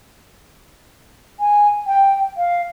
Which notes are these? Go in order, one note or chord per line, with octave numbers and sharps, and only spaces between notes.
G#5
G5
F5